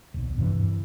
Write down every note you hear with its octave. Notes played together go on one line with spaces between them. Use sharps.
D#1 B1
G2 C3 D#3 E3